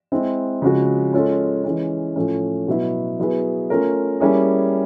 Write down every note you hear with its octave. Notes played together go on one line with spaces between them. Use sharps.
G#3 C4 E4
C#3 F3 G#3 C#4 F#4
G#3 C#4 F4 A4 C#5
E3 G#3 C#4
A2 F3 A3 C#4
B2 F#3 B3 E4
F#3 B3 E4 G#4 B4
A3 C#4 F4 A#4
G3 A#3 C#4 E4 G#4